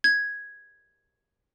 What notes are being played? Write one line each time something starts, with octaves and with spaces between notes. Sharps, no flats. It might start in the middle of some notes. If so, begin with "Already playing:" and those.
G#6